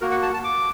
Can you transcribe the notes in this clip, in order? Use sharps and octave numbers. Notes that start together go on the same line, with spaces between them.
A#3 F#4 A#4
F#5
A5
A5
D6